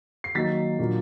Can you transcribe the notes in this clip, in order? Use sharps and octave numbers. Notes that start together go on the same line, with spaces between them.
C7
D#3 F#3 A#3 D#4 A6 B6
A#2 F#3 A#3 D4